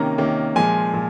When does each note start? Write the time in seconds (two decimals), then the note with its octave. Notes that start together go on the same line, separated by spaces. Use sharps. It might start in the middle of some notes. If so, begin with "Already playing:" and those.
Already playing: C3 D#3 A#3 C#4 A#5
0.18 C3 D#3 A#3 C#4
0.56 A#2 F3 G#3 G#5
0.93 A#2 F3